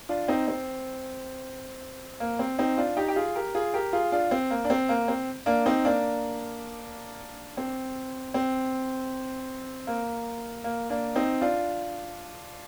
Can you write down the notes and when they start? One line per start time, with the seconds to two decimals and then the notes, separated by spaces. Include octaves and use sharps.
0.09 D4 F4
0.28 C4 D#4
0.48 C4
2.20 A#3
2.39 C4
2.58 C4 D#4
2.78 D4 F4
2.97 D#4 G4
3.08 G4
3.16 F4 G#4
3.35 G4 A#4
3.55 F4 G#4
3.74 G4 A#4
3.93 F4 G#4
4.12 D4 F4
4.31 C4
4.50 A#3
4.65 D4
4.70 C4
4.89 A#3
5.08 C4
5.46 A#3 D4
5.66 C4 D#4
5.85 A#3 D4
7.57 C4
8.34 C4
9.87 A#3
10.64 A#3
10.90 A#3 D4
11.16 C4 D#4
11.41 D4 F4